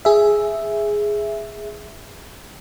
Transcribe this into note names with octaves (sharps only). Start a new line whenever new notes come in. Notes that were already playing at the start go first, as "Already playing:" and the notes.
G#4 E5